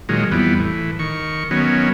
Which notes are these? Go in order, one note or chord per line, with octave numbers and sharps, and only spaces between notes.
A#2 D#3 F#3 G#3
F2 E3 G3 B3
A2 E3
D#3 C#6
D#3 F#3 B3 C#4